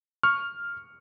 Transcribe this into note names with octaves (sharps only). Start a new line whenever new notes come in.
C#6 F6